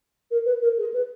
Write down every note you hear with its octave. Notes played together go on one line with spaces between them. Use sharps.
A#4
B4
A#4
G#4
B4